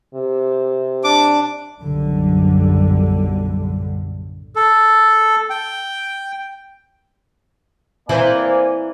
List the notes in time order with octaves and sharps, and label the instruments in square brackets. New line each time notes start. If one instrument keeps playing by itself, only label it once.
[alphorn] C3
[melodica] D4 [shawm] D6
[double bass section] B1 F#2 A2 D3 G3
[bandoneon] A4
G5
[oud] E3 C4 E4 [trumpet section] A#3 D5 G#5